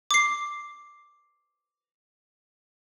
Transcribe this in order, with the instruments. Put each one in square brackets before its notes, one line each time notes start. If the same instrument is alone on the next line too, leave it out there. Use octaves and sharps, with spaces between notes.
[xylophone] D6 C7